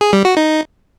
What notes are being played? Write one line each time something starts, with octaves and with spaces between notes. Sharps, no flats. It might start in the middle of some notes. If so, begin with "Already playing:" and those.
G#4
G3
F#4
D#4